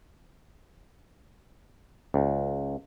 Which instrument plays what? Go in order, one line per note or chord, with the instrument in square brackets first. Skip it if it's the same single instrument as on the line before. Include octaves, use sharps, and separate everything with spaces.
[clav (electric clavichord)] C#2